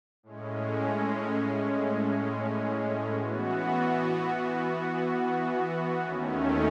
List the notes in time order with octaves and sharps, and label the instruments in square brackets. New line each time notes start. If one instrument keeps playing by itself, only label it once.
[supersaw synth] A2 G#3 C#4
E3 B3 F#4
D#2 D#3 A3 C#4